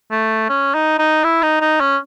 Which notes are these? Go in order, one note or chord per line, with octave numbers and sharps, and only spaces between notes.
A3
C#4
D#4
D#4
E4
D#4
D#4
C#4